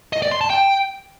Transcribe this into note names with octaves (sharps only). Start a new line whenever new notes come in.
D#5
D5
C6
A5
G5